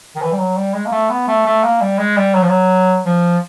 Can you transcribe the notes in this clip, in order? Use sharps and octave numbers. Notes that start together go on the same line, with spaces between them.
D#3
E3
G3
F#3
G3
G#3
A#3
A3
B3
A3
A3
A#3
G3
G#3
G3
F#3
F3
F#3
F3